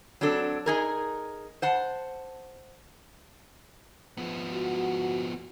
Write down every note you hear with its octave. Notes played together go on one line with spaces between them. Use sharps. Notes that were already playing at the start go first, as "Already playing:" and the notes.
F#3 C4 D4 A4
D#4 G#4 A#4
C5 F#5 A5
F3 B3
F#4